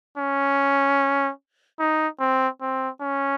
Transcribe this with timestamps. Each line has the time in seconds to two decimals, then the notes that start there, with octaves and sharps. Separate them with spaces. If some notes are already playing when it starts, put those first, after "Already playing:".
0.18 C#4
1.79 D#4
2.20 C4
2.61 C4
3.01 C#4